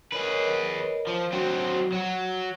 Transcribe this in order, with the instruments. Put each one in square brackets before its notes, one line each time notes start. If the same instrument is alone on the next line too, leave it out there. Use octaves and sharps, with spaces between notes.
[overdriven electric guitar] G#4 B4 [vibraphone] A#4 C#5 D#5
[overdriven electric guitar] F3
[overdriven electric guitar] F#3 C4 [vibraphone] F#4
[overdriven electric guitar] F#3